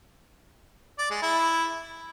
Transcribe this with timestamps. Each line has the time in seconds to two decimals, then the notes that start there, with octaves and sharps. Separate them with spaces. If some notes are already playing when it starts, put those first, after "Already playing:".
0.99 D5
1.10 G#3
1.22 E4